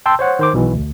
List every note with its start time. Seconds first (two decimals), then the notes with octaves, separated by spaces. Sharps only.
0.06 G5 A5 C6 E6
0.19 C5 C#5 F#5
0.39 D#3 C5 D6
0.53 B1 B2 E3
0.74 D2